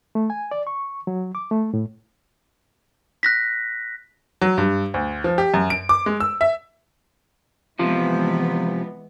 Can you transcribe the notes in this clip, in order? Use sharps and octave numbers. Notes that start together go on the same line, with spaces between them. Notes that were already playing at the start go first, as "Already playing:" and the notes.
A3
G#5
D5
C#6
F#3
D6
A3
A2
F#6 A#6 B6
F#3
G2
D2
F3
G4
F#2
D7
D6
G#3
E6
E5
C3 E3 F3 G#3 B3 F4